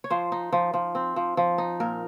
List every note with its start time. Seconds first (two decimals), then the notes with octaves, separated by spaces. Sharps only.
0.04 C#5
0.10 F3 C5
0.32 D#4
0.53 F3
0.74 F3
0.95 C4
1.16 F3
1.37 F3
1.58 D#4
1.80 A#2 A#4